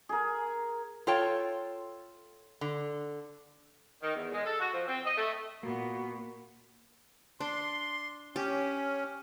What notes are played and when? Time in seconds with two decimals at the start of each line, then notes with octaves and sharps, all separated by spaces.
0.09 G#4 A#4
1.07 F4 A4 C#5 G5
2.61 D3
4.01 D#3
4.15 E2
4.32 G#3
4.45 A4
4.60 F#4
4.73 F3
4.87 C4
5.05 D#5
5.16 A3
5.63 A#2 A#3 B3 F#4
7.40 D4 C6
8.36 C#4 G4